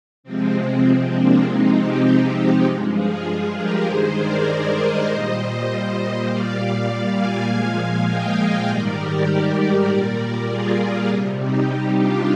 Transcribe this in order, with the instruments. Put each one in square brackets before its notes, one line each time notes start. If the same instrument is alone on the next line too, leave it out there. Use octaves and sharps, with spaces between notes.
[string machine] C3 F3 G#3 C4
C4
A#3 D4
C3 F3 G#3 C4 D#4
D#4 G4
G2 F3 G#3
F4 G#4
G4 A#4
G2 D#3 G#3 G#4 C5
A#4 D5
C5 D#5
A#2 G3
C5 D#5
A#2 G3 D5 F5
F5 G#5
A#2 F3 G#3
F5 G#5
D#5 G5
G#2 D#3 G3 A#4 D5
G4 A#4
A#4 D5
A#2 G3
F4 G#4
C3 G3
D#4 G4
D4 F4